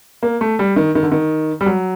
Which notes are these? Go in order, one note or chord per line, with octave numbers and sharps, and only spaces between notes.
A#3
A3
G3
D#3
D#3
D3
D#3
G3
F#3